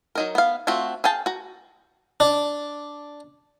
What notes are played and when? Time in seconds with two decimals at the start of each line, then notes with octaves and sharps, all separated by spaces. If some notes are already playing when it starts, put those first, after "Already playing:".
0.15 F#3 D#4 A#4
0.35 B3 F5
0.67 A3 C4 F4 F#4
1.04 G#4 F5 G5 A5
1.26 F#4 A#5
2.20 D4